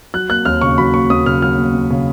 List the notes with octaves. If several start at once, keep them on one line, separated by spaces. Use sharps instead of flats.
F#3 F#6
A#3 F#6
D#2 F6
C#3 C#6
F#3 B5
A#3 C#6
D#2 D#6
C#3 F6
F#3 F6
A#3
D#2
C#3